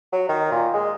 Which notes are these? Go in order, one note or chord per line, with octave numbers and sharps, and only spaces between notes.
F#3
D#3
A#2
G#3